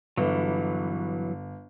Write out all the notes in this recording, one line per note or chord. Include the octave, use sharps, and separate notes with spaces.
G1 E3 F#3